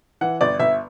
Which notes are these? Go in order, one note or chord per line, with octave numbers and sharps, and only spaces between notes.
E3 F#5
G1 D5
G1 E5